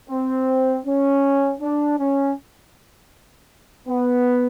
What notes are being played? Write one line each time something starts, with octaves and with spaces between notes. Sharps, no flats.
C4
C#4
D4
C#4
B3